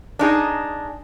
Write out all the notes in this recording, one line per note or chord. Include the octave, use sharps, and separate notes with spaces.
D4 D#4 G#4